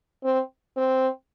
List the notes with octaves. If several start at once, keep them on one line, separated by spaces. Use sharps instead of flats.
C4
C4